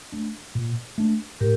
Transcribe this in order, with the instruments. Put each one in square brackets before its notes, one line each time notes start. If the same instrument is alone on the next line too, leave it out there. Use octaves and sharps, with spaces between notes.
[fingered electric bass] A3 D4
A#2
A3 D4
[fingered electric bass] A2 [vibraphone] G4 A#4